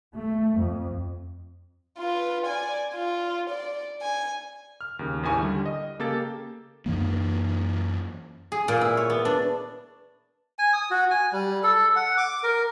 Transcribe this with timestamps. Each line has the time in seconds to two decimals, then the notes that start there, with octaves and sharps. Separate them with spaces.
0.18 A3
0.59 F2
1.98 F4 B4
2.46 D5 G#5
2.94 F4
3.50 D5
4.02 G#5
4.81 F6
4.99 D#2 C#3
5.23 A1 D#2 E4 G4 G#5 C#6
5.41 D3 G3
5.66 D#5
5.99 C#3 A#3 G4 A4 A6
6.86 F#2 E3 A#3
8.52 G#4
8.68 A#2
8.81 E4
8.97 C#5
9.10 B3
9.25 D4
10.59 G#5
10.73 D#6
10.91 F#4
11.11 G#5
11.32 G3
11.64 A4
11.96 F#5
12.17 D6
12.43 A#4